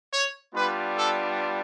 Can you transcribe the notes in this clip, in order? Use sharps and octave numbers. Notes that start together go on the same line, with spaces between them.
C#5
G3 B3 D4 F4 B4
A4